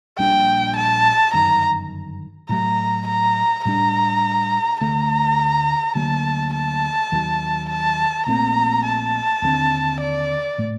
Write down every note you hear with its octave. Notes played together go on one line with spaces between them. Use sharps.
A#1 A#2 G3 D4 G5
A5
G1 F#2 D#3 A#5
A2 F#3 A3 A#5
A#5
A2 G3 D4 A#5
D2 D3 A3 A#5
D2 D3 F#3 A#3 A5
A5
D#2 D#3 F#3
A5
A#1 A#2 A3 C4 A#5
A5
D#2 D3 A3 C4
D5
A2 A3